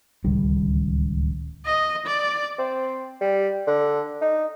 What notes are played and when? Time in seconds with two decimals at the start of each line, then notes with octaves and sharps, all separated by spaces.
0.24 D1 C#2 D#3 G3
1.66 D#5
2.06 D5
2.58 C4
3.21 G3
3.67 D3
4.21 D#4